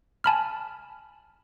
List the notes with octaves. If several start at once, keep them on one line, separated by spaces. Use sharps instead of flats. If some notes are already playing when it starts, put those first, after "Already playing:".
G#5 A5 B5 F6